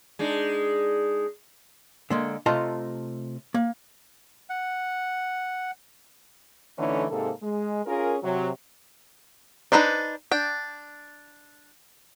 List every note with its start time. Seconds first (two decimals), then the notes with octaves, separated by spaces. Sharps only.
0.19 G#3 D4 D#4
2.10 D3 G#3 A#3
2.46 C3 A3 F4 D#5 A5 A#5
3.54 A#3
4.49 F#5
6.77 D3 E3 A3 C#4 D#4
7.10 G#2 C3 A#3 A4
7.42 G#3
7.85 C#4 F4 G#4 A#4
8.23 C3 F#3
9.72 D4 D#4 B4 C5 D5
10.31 D4 G5